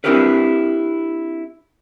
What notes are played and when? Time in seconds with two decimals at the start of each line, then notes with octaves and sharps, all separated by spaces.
0.04 C4 D4 E4 G4 A#4 B4